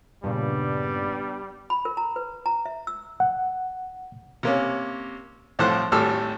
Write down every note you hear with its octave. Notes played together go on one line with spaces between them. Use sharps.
G2 A#2 C#3 G3 B3 D4
B5
A#4
A#5
B4
A#5
E5
E6
F#5
C3 A#3 C#4
C2 A2 F3 A4 C5 F#6
G#1 A2 G3 A4 E6 F6